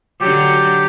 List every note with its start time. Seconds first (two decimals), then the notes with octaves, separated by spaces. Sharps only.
0.21 D3 F#3 G4